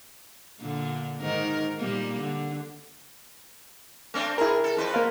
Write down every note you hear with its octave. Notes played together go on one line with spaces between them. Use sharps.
A#2 D3
G#2 D#3 A#4
A#2 G3 A#3
D3
A3 C4 D4
E4 G#4 A#4
A4
F2 B4 C5
A#3 F5